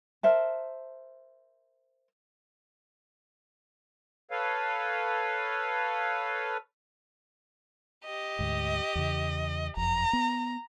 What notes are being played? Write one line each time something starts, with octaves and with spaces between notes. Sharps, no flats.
A#4 C5 E5 A5
A4 B4 C#5 F5
G4 D#5
D2 G#2
E2 C#3
F#1 F2 A#5
B3